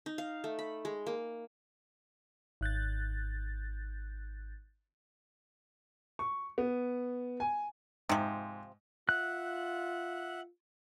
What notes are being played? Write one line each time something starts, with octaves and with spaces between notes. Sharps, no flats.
D#4
F5
A3
B5
G#3
A#3
G#1 F#6 G6 A6
C#6
B3
G#5
G#2 C3 F3
F4 E5 F#5 F#6